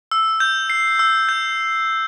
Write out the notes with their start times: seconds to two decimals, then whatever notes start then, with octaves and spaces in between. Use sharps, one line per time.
0.11 E6
0.40 G6
0.70 C7
0.99 E6
1.29 G6